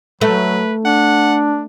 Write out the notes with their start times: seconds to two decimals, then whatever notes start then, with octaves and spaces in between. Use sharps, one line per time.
0.21 F#3 A3 B4
0.85 D4 F#5